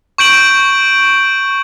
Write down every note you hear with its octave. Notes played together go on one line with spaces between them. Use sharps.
C#6 G6 D7 F#7